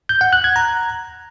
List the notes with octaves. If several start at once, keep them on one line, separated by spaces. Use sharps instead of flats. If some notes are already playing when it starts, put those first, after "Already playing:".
G6
F#5
F#6
G#6
A#5